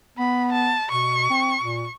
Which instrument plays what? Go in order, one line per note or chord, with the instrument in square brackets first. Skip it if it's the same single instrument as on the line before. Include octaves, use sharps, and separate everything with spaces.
[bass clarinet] B3 [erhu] B5
[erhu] A5
[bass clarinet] B2 [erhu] C#6
[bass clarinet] C4
A#2